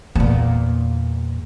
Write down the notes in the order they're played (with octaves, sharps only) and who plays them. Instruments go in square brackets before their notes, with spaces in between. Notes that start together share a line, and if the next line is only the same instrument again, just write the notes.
[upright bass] E2 A#2